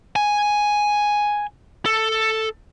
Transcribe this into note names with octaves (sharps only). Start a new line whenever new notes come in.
G#5
A4